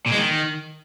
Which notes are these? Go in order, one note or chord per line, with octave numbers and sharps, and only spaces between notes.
A#2
G#3
D#3